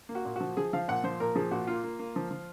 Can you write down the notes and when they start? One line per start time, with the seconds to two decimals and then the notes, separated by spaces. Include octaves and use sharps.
0.09 A#3
0.15 F#4
0.25 A#2
0.36 F3 F#4
0.57 F3 G#4
0.73 F3 F5
0.88 A#2 F#5
1.04 F3 C5
1.20 A#2 A#4
1.36 F3 G#4
1.51 A#2 F#4
1.67 A#3 F4
1.84 A#3
1.99 A#3
2.16 F3
2.31 F3